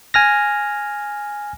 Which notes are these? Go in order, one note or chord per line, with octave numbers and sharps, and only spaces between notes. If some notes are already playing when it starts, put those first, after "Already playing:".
G#5 F6 A#6